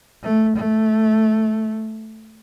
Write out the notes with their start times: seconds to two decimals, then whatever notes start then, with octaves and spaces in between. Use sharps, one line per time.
0.23 A3
0.56 A3